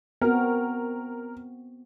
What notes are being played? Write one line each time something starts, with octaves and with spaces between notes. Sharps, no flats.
B3 C4 F#4 A#4